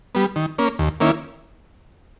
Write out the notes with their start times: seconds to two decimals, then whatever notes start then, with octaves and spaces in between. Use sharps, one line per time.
0.15 G3 B3
0.36 D#3
0.58 A#3 C#4
0.79 D#2
1.00 D#3 A#3 C#4 E4